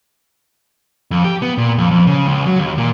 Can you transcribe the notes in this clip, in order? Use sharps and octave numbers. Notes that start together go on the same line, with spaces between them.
F2
G4
B3
A#2
F2
F2
C#3
C#2
F#3
D#2
A#2